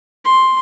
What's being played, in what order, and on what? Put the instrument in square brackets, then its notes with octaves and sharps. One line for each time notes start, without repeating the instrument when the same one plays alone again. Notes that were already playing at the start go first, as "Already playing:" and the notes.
[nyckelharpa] C6